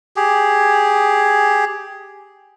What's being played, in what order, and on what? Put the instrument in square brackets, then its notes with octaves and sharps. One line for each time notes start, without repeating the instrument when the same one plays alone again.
[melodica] G4 G#4